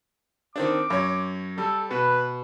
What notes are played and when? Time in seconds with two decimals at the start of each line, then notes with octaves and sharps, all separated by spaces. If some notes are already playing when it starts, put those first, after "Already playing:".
0.56 D#3 C4 D4 D6
0.90 F#2 C#5
1.58 G3 A4
1.91 B2 B4